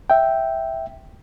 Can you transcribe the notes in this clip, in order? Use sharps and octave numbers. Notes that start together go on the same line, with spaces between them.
E5 G5